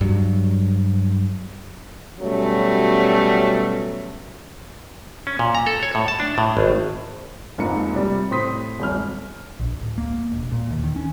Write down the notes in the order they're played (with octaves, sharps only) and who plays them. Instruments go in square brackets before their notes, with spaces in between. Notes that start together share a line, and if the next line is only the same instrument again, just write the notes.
[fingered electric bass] G2 F#3
[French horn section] B2 F#3 G3 A3 C#4
[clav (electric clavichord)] C#4
A#2
A#5
A4
C#5
A2
A5
D4
A2
G#1
[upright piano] F1 G#2 F3 A#3 C#7
C3 G3
A2 C4 C6 D#6 B6
D#1 G#1 F6
[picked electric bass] A#1
D1
A#3
E1
A#2
D#2
D#3
C#4